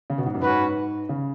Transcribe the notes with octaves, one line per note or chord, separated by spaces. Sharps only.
C#3
B2
G#2
F#2
G#2 C#4 F#4 B4
C#3